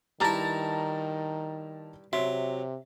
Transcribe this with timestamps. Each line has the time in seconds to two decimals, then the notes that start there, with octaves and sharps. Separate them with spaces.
0.20 G2 D#3 E4 A5 A#5 A6
2.13 C3 F#3 E5 C6